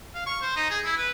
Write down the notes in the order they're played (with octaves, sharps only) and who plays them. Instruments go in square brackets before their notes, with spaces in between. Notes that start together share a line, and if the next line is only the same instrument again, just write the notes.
[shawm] F5
C#6
C5
D#4
G#4
E4
B4